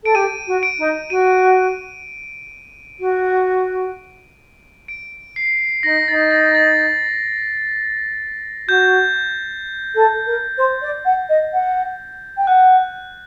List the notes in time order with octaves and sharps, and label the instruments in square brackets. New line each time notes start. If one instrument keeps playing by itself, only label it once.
[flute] A4 [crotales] D7
[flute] G4 [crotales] D#7
[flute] F#4
[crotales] D7
[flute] D#4
[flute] F#4 [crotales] D#7
[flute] F#4
[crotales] D7
C7
[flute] D#4 [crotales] A#6
[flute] D#4 [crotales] A6
[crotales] A6
A6
[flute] F#4 [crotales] G6
[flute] A4
A#4
C5
D5
F#5
D#5
F#5
G5
[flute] F#5 [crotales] F#6